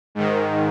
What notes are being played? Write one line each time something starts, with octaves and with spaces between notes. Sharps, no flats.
G#2 D#3